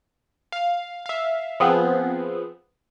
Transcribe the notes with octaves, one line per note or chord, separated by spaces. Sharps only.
F5
E5 F5
F3 B3 C4 G#4